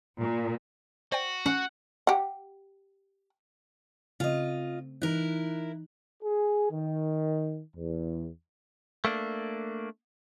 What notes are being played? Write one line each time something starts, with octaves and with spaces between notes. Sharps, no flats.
A#2
F#4 C5 D5 G5
C#4 F#5
G4 F#5
C#3 A3 C4 F4 D#5
E3 D#4 E4 A#4 F#6
G#4
D#3
E2
A3 A#3 D4